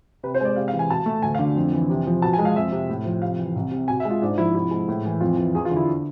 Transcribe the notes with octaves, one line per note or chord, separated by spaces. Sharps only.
C3 B4
C5
G#3 D5
C3 F5
F5
E3
G#5
B2 A5
A3
D2 G#5
F5
D3
F2
E3
C3
F3
B2 A5
G#5
G#3
F5
F2 E5
C3
A2
F3
C3 F5
E3
C2
C3
B2 G#5
E5
G#3
F4
G#2 D4
F3 E4
C3 E4
G#3
A2
E3
F2 F4
E3
E2 G#4
F4
D3
E4